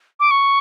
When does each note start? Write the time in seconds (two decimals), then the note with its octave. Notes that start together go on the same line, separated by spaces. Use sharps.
0.20 D6
0.31 C#6